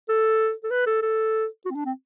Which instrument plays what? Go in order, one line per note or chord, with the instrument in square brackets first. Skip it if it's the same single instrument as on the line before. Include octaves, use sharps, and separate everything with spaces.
[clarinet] A4
A4
B4
A4
A4
F#4
C4
D4
C4